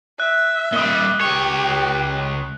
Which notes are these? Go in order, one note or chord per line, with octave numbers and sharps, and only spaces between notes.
E5 F#6
A#2 G3 D#6 G7
C#2 G4 C#5